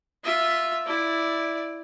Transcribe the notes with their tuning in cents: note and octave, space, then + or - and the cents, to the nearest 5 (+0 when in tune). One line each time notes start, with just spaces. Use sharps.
F4 +0 E5 +0
E4 +0 D5 +0